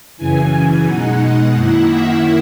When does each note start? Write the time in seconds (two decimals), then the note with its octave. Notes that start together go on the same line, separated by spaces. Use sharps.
0.17 F#2 C#3 E3 G#5
0.52 G#5
0.85 B2 G#3 D#4 F#5
1.54 F#2 D#3 A#3 E4 F#5
1.88 E5